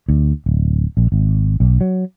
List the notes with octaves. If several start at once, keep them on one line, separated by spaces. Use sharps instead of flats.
D2
D1
A#1
G#1
B1
F#3